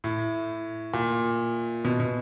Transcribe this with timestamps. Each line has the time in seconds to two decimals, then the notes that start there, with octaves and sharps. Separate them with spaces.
0.04 A2
0.94 A#2
1.85 B2
2.00 B2